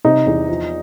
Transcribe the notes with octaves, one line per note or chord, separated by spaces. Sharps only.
C3 D#4
E2
F3